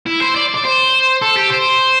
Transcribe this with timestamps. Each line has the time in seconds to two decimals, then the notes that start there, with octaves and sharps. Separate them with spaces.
0.06 E4
0.21 C5
0.35 D5
0.54 D5
0.64 C5
1.22 A4
1.36 G4
1.51 C5